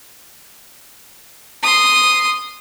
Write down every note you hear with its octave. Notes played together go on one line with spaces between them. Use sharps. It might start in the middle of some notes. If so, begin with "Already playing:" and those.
C6 D#6